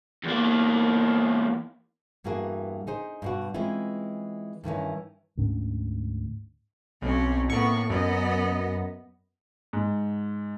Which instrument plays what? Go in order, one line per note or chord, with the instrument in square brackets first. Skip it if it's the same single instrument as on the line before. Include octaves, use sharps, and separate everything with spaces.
[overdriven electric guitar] E2 A#3
[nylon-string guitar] E2 G2 E3 A#3 F#4 G#4
D#4 G#4 C5
G2 B2 F#4
E3 G#3 C4 C#4 E4 F4
G2 D#3 E3 C#4
[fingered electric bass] D2 G#2 C#4 D4
[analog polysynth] B1 [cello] C4 C#4
[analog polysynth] A2 C#6 [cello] A#3 B3
[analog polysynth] F#2 [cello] B3 D#5
[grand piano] G#2